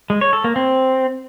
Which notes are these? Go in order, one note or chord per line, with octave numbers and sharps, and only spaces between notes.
G#3
C#5
A4
A#3
C4